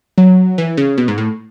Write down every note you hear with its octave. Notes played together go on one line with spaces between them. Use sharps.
F#3
E3
C#3
B2
G#2
A2